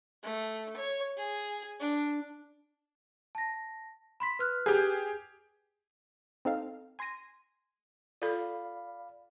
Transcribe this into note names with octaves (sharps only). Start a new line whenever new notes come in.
A3
C#5
G#4
D4
A5 A#6
B5 C6 B6
B4 F6 F#6
G4 G#4
C4 D#4 A4 F5
G#5 C6 G#6 A#6 D#7
F4 A4 D5 F5 B5